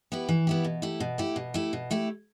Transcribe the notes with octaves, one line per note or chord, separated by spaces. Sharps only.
B3 E4 G4
E3
B3 E4 G4
B2
A3 E4 G4
B2
A3 E4 G4
B2
A3 E4 G4
B2
A3 E4 G4